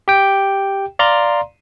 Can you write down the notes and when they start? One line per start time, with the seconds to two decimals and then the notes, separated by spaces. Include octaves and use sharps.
0.08 G4 G5
0.99 D5 F5 A#5 C6